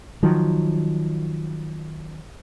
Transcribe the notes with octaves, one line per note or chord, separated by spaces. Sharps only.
D#3 F3 F#3